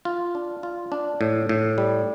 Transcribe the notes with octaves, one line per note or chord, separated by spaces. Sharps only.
F4
D4
F4
D4
A2
A2
G3